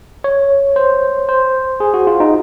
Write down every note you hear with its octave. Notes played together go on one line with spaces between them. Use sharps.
C#5
C5
C5
G#4
F#4
F4
D#4